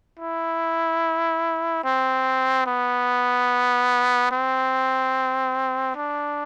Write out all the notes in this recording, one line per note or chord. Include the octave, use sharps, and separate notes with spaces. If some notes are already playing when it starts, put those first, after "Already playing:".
E4
C4
B3
C4
D4